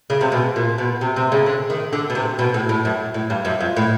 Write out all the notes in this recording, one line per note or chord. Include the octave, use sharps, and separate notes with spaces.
C#3
C3
B2
A#2
B2
C3
C3
C#3
D3
D#3
D3
B2
C3
B2
A2
A2
F#2
A2
G2
F#2
F2
A2